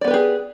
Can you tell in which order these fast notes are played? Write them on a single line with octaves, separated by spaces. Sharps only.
D5 B3 B4 G4 G#4